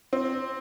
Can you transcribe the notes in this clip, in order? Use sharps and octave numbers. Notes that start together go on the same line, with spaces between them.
C4